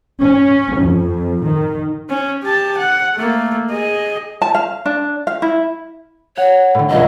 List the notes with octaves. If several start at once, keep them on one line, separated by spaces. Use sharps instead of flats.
C#4
F2
D#3
C#4
G4 A5
F#5
A3 A#3
G#4 D#5
A5
F5
D4
F5
E4
C#5 F#5
A2 D3
D#1 C#2 D#5